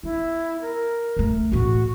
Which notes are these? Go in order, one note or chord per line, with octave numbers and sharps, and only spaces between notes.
B3 E4
A#4
C#2 A3
E2 A2 F#4